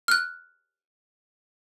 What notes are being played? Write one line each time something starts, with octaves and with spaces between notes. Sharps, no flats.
F6 F#6